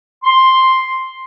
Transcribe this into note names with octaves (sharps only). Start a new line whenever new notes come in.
C6